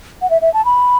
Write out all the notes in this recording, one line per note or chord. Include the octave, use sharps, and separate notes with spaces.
F#5
E5
E5
A5
B5